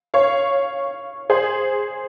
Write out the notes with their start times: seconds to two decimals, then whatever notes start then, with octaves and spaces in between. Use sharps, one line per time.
0.14 C#5 F5
1.30 G#4 C5